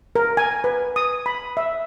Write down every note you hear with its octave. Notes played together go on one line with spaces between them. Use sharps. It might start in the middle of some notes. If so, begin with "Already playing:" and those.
A#4
G#5
B4
D#6
B5
E5